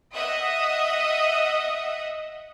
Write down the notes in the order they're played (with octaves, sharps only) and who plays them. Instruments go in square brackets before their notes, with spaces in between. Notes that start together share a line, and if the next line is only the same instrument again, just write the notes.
[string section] D#5 E5 F#5 D#6